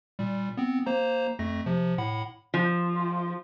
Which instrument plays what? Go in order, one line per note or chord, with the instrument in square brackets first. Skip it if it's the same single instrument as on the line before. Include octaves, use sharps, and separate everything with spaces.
[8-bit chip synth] A#2 G3
B3 C4
A#3 C5 A#5
F2 A3 A#6
C3 F3
A2 F#5 B5
[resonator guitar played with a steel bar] F3